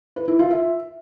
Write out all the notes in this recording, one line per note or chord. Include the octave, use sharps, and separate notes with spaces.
B4
E4
F4
E5